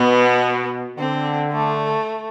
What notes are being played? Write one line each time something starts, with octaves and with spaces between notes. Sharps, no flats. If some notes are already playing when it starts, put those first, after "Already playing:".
Already playing: B2 B3
D3 C4
A3